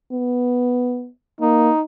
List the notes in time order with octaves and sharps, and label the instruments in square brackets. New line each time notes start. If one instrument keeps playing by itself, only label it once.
[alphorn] B3
[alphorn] A#3 [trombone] D#4